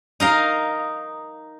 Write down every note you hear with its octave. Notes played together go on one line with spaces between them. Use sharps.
D#4 A#4 F5